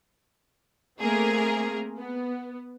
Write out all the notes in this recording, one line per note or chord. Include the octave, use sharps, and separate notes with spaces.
A3 A#3 C4 G#4 A#4
B3